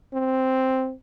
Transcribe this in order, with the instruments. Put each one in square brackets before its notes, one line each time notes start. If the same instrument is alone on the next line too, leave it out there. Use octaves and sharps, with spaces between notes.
[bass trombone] C4